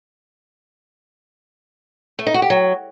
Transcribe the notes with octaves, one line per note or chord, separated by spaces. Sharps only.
A3
D#4
F#4
G4
F#3